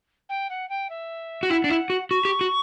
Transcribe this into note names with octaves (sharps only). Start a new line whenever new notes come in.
G5
F#5
G5
E5
F#4
E4 G5
F#5
D4
E4
F#4
F#4 C#6
G4
F#4